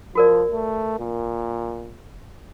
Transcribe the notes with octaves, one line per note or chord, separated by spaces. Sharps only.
F3 F#4 A#4 D5
A3
A#2